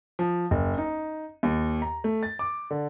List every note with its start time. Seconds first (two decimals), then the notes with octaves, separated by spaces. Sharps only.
0.19 F3
0.51 F#1
0.78 D#4
1.43 D#2
1.82 A#5
2.04 A3
2.23 A6
2.39 D6
2.71 D3